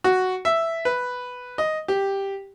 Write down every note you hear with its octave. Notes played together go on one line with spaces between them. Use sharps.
F#4
E5
B4
D#5
G4